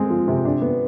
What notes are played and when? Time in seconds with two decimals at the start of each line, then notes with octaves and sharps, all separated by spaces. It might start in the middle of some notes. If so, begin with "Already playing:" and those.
Already playing: G#3 C4
0.10 F3
0.28 C3
0.45 D4
0.62 B3